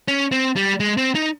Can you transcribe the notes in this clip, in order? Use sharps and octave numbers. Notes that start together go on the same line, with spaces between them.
C#4
C4
G3
G#3
C4
D#4